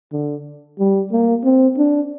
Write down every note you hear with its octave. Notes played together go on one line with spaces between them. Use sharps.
D3
G3
A#3
C4
D4